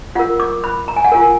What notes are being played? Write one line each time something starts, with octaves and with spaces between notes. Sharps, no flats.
F4 A#4 F#5
D6
B5
A#5
G#5
F#5
F4 A#4 G#5